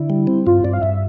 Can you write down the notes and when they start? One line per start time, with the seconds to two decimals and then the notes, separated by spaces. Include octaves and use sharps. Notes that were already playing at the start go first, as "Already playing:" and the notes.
Already playing: D3 E4
0.10 G3
0.27 C4
0.47 G2 F4
0.64 G2 D5
0.73 F5
0.82 G2 E5